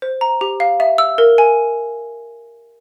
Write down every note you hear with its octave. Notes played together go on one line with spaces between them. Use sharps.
C5
A#5
G4
F5
E5
E6
A#4
G#5